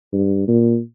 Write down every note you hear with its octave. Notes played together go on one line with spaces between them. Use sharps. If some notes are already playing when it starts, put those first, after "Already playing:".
G2
A#2